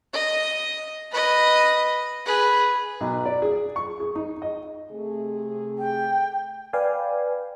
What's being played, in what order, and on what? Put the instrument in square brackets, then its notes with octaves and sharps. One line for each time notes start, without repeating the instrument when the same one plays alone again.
[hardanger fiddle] D#5
B4 D#5
G#4 B4
[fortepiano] B1
D5
G#4
C#6
G#4
D#4
D#5
[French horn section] C3 A3 G#4
[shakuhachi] G5
[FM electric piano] B4 D5 F5 G5 G#5